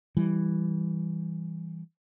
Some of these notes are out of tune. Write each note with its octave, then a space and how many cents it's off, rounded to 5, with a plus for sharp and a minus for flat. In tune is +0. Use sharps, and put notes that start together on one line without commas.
E3 +0 G3 +0